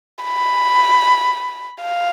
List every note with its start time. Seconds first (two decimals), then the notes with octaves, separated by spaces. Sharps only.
0.24 B5
1.82 F5